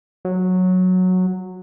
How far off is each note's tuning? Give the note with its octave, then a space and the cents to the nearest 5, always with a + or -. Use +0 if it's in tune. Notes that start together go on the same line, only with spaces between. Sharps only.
F#3 -10